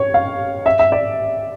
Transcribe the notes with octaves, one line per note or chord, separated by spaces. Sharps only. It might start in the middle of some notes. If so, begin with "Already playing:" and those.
Already playing: C#5
F5
E5
E5
D5